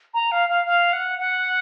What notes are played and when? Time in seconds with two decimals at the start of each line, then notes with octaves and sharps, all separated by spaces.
0.14 A#5
0.31 F5
0.49 F5
0.66 F5
0.93 F#5
1.19 F#5